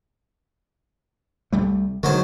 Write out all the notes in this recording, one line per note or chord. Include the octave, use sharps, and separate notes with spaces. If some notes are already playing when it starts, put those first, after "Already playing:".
C2 G3 A3
D3 D#3 F#3 G#3 C5